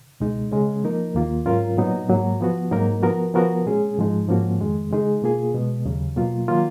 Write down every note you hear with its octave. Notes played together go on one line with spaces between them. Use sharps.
C#2 B2 G#3 D#4
C#3 G#3 C#4
F3 A#3 D#4 A#4
D#2 D#3 A#3 F4
G#2 F#3 C#4 F4 A#4
A#2 F#3 B3 D#4
G#2 F#3 A#3
F3 B3 F#4
G#2 F#3 A#3 D#4 A#4
F3 B3 F#4 A#4
F3 B3 F#4 A#4
A#2 G#3 C#4 G#4
G#2 F3 G#3 D#4
G#2 F3 A#3 C#4 F#4
F2 D#3 G#3
C#3 G#3 D#4 G#4
B2 A#3 F4 G#4
B2 G#3 B3
D#2 C#3 F#3
B2 F#3 A#3 F4
D#3 F#3 A#3 F4